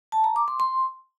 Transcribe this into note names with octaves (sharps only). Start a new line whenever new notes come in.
A5
A#5
D6
C6
C6